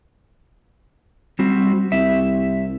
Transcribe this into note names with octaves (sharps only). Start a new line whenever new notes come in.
G3 C4 F#4
C2 E5